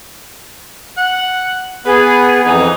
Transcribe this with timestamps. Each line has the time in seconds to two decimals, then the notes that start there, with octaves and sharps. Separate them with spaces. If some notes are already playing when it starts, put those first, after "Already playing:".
0.97 F#5
1.86 B3 G#4 B4
2.46 F2 E3 D#4